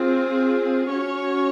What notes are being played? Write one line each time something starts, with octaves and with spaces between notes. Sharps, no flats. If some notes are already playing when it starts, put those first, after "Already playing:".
Already playing: C4 F4 G#4
C#4 F#4 C#5